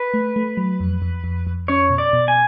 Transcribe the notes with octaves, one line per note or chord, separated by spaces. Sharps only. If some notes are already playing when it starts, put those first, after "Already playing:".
Already playing: B4
A3
A3
F#3
F2
F2
F2
F2
C#4 C#5
B2
D5
B2
G#5